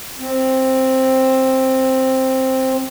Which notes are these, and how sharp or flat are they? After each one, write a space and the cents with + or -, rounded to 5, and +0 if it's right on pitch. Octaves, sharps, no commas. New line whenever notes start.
C4 +5